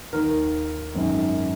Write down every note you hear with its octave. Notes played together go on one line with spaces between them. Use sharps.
D#2 D#3 A#4
G#1 F#2 D#3